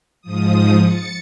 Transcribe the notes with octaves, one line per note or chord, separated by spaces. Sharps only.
G#2 F3 D#6
A6 C#7